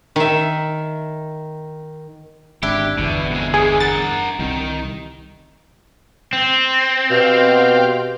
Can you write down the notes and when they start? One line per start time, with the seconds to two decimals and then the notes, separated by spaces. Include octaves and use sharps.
0.16 D#3 E5
2.63 G#1 D4 E4 G4
2.98 G1 E2 B2
3.31 F2 G#3
3.54 E3 G#3 G#4
3.80 A#4 F#5 A6
4.39 C2 D#3
6.33 C4
7.11 B2 G4 F5